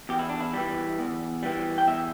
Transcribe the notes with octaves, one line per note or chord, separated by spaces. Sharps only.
E2 G4
E4
D4
E4
E3 G3
E2
E3 G3
G5
E2 E5